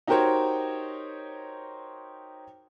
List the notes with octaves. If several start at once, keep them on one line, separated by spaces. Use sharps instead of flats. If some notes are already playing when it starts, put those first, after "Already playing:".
D#4 F#4 G4 A#4 C5 C#5